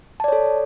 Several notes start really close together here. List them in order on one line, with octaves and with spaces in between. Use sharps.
A5 D5 C#5 A4